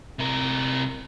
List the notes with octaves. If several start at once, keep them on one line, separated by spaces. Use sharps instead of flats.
C3 A#4